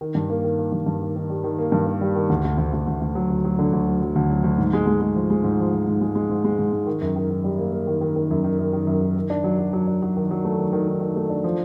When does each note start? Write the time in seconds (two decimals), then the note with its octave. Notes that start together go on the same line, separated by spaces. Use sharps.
0.01 D#3
0.15 G2
0.30 A#3
0.44 D#3
0.59 A#3
0.72 G2
0.86 G2
1.02 D#3
1.16 D#3
1.30 G3
1.44 D#3
1.59 A#3
1.72 G2
1.86 A#3
2.01 G3
2.16 D#3
2.29 D2
2.44 D2
2.58 D2
2.73 D2
2.87 D2
3.01 D2
3.15 F#3
3.30 D2
3.45 F#3
3.59 D3
3.73 D2
3.87 F#3
4.02 F#3
4.15 D2
4.30 F#3
4.44 D2
4.58 G#2
4.73 G#3
4.87 G#3
5.01 G#3
5.16 F3
5.30 G#3
5.44 G#2
5.59 F3
5.73 F3
5.87 G#2
6.01 G#3
6.15 G#3
6.29 G#2
6.44 G#3
6.59 G#2
6.73 G#2
6.87 D#3
7.01 F#2
7.16 D#3
7.31 D#3
7.44 G3
7.58 A#3
7.72 A#3
7.87 D#3
8.01 D#3
8.16 D#3
8.31 F#2
8.44 D#3
8.59 F#2
8.73 D#3
8.87 F#2
9.01 D#3
9.16 D#3
9.30 D4
9.44 F#3
9.59 F#3
9.73 F#3
9.88 D4
10.02 F#3
10.16 D#3
10.31 F#3
10.45 A3
10.58 D#3
10.73 D#3
10.88 D#3
11.01 D#3
11.16 A3
11.30 D4
11.44 F3